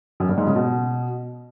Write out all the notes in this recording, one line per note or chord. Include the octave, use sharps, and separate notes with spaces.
F#2
G2
G#2
C#3
B2